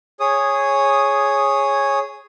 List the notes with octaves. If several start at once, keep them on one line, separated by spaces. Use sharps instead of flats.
G#4 C#5 D#6